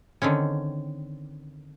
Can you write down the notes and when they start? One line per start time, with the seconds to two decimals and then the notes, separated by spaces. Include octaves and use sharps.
0.22 D3 D#3 C4 C#4